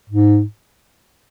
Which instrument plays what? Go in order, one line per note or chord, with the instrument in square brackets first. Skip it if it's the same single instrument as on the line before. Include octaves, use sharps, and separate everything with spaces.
[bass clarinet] G#2